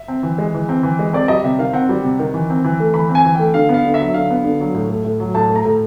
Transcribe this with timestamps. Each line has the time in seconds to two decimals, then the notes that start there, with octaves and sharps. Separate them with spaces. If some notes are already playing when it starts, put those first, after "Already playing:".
Already playing: E5
0.08 C4
0.23 E3
0.38 G#3
0.54 E3
0.69 C4
0.83 E3
0.99 G#3
1.13 C4 D5
1.28 G3 D#5
1.44 C3 E5
1.59 D#3 F5
1.73 C4 F#5
1.89 G3
2.04 C3
2.19 D#3
2.34 E3
2.50 C4
2.64 E3
2.80 A3
2.94 E3 B5
3.09 C4
3.15 G#5
3.25 E3
3.35 A3 G5
3.54 D3 F5
3.69 B3
3.74 F5
3.85 D3
3.94 E5
4.00 F#3
4.14 D3 F5
4.30 B3
4.45 D3
4.60 F#3
4.74 A2
4.90 A3
5.05 A2
5.20 F#3
5.34 A2 A5
5.50 A3
5.55 A#5
5.65 A2